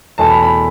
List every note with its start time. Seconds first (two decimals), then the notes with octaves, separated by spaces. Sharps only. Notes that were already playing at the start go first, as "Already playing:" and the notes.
0.18 E2 B2 A3 E4 A5
0.31 B5
0.43 B5